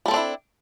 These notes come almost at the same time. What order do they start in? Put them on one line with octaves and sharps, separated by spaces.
G3 A4 C4 D4 E4